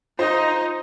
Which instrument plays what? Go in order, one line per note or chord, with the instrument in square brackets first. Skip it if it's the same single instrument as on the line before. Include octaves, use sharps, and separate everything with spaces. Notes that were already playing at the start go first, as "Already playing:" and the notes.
[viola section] D#4 [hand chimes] F4 [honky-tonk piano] C5 [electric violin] D#5